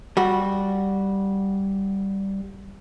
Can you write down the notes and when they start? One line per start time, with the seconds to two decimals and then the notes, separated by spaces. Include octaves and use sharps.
0.17 G3 F#4